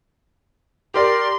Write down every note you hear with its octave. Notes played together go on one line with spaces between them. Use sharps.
G4 A#4 D5 C6